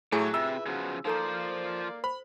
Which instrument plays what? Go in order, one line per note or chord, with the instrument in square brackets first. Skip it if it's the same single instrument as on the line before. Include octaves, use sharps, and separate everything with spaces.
[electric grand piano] A2 A3 [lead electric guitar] F#3 [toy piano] E4 G#4 G#5
[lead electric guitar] C3 [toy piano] F4 [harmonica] B4 E5 [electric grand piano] E6
[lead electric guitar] C#3 F3 [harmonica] F#3 B3
[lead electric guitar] F3 C5 [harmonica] A#3 D5 [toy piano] D#4 A4 A#5
[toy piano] C5 [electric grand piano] B5